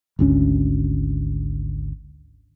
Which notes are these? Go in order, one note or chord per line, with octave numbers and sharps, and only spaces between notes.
G#1 D2 C#4